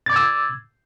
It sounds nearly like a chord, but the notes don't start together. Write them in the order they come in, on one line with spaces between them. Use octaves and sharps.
A6 D6 G#6 E6